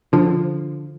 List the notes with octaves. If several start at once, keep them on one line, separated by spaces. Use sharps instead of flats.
D3 F3